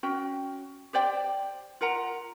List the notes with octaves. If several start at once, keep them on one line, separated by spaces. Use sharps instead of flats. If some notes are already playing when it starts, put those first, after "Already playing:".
C#4 F#4 G5
G4 C5 D5 G5
F4 A#4 F#5 A#5